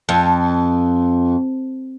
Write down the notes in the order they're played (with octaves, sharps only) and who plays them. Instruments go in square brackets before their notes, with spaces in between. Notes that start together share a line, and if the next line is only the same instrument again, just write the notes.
[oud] F2